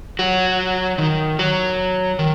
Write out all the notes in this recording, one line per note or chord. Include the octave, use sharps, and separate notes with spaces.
F#3 F#4
D#3 D#4
F#3 F#4
D#3